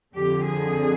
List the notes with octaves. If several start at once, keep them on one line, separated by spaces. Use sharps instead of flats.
F2 D3 G4
G#4